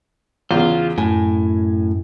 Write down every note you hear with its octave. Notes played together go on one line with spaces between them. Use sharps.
E2 C#3 F4
F#2 A2 G#5